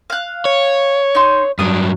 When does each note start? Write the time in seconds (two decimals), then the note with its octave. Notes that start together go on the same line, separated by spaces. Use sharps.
0.10 F5 F#6
0.45 C#5
1.15 D#4 C6
1.59 G2 F#3 D4 D#6